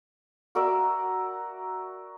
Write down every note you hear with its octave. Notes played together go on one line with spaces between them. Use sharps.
F#4 A#4 D5 E5